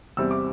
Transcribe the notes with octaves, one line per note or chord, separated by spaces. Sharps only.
E2 C3 G3 C4 E4 E6
D6